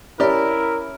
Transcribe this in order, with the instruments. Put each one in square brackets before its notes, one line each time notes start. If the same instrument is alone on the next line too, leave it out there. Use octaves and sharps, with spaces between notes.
[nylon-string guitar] C#4 [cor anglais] E4 [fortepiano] G4 D5 [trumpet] A#4